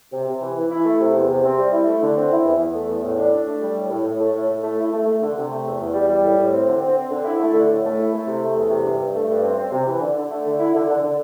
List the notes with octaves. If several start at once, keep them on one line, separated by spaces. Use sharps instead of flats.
C3
C3
E3
E3
E4
A3
C3
E2
C3
C4
G3
E4
A3
D3
C4
E4
E2
E2
A3
E2
A2
D4
D4
A3
G3
A2
A2
A2
A3
A2
A2
A3
E4
A3
A3
D3
C3
A3
E2
E2
G3
G3
A2
A2
C4
D3
C4
C4
D3
E4
A3
D3
A2
A3
E4
A3
C3
A3
E2
C3
G2
G2
A3
G2
C4
C4
C3
E3
D3
D3
A3
D3
E4
D3
D3
D3